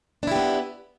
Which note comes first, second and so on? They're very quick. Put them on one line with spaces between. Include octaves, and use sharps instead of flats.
D4 E4 G4 B3